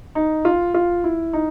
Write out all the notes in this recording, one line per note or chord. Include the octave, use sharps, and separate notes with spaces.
D#4
F4
F4
E4
D#4